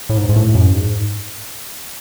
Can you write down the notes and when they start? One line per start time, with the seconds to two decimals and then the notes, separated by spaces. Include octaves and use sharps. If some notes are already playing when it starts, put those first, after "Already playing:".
0.09 A2
0.17 G#2
0.29 G#2
0.36 A2
0.55 F#2
0.74 G#2